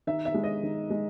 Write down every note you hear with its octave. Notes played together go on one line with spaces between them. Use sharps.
D#3 E5
E5
G#3
D#5
D#3
G#3